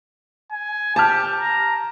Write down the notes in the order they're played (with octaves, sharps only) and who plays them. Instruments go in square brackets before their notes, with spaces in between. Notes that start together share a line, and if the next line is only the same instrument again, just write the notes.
[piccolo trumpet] G#5
[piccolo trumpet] G4 [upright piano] A5 F6
[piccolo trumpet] A#5